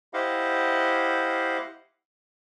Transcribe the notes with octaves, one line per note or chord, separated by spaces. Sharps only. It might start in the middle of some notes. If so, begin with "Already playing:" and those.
E4 G4 C5 D#5 F5 F#5